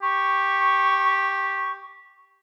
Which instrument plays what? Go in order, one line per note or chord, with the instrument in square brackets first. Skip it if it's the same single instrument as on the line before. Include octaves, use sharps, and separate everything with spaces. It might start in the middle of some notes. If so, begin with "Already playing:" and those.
[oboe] G4 [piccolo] C#6